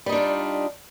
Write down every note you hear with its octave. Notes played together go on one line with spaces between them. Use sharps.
G3 D4 D#4 F4